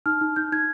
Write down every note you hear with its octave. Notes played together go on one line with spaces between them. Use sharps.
D#4 F6
D#4
D#4 G6
D#4 G#6